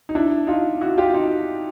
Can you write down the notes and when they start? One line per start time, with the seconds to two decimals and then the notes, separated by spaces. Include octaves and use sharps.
0.09 D#4
0.15 D4 E4
0.47 D#4 F4
0.81 E4 F#4
0.98 F4 G4
1.13 D#4 F4